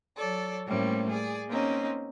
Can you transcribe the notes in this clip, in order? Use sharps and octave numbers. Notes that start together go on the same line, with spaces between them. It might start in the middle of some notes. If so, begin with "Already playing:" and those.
F#3 A4 C#5 D5
A2 G3 A3 A#3 C4 C#4
G#4 D5
A#3 C4 C#4 D#4